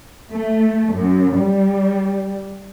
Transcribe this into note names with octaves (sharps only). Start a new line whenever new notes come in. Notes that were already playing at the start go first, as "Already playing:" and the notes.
A3
F#2
G3